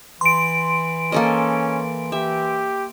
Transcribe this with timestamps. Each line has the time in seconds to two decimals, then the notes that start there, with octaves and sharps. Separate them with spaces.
0.21 E3 C6 D7
1.12 A#3 C#4 A4 D#5
2.12 G4 E5